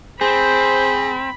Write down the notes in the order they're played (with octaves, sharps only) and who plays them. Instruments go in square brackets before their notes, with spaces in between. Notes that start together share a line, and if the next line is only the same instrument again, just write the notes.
[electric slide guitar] C4 [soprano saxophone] G#4 [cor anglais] C5 [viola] B5